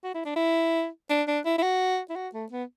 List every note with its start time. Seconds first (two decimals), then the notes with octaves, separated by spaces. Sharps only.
0.04 F#4
0.14 E4
0.25 D4
0.36 E4
1.10 D4
1.28 D4
1.45 E4
1.58 E4
1.63 F#4
2.09 E4
2.16 F#4
2.34 A3
2.51 B3